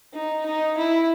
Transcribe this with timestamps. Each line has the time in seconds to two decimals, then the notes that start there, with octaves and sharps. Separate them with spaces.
0.13 D#4
0.46 D#4
0.77 E4